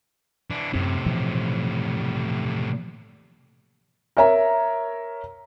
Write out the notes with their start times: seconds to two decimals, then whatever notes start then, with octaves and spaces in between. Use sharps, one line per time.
0.50 E3 D4
0.73 F#2 A2 C3 C4
1.06 B2 E3 F3
4.17 A#4 C#5 E5 A#5